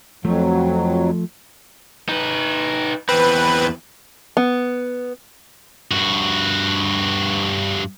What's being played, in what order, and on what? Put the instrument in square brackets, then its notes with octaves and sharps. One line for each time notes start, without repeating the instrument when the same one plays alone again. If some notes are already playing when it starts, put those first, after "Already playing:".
[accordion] F2 F#3 [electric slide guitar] F3 A3
[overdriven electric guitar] D#4 B4
[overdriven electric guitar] E2 C4 [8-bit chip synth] B4
[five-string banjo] B3
[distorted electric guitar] G2 F#4